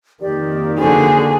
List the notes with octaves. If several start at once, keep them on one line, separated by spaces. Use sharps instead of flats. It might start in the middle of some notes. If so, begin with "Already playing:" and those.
F2 D#3 A#3 G4 D5
D3 F#4 G#4 C5